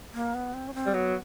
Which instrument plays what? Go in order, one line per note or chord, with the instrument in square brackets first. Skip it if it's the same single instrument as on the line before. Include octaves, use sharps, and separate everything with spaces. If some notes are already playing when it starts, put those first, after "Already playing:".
[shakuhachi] A#3
B3
C4
C#4
C4
[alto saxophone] G3
[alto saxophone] F#3 [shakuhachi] B3